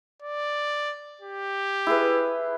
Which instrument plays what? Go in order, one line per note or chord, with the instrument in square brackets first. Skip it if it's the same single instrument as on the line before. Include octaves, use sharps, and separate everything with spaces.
[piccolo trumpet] D5
G4
[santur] E4 G#4 B4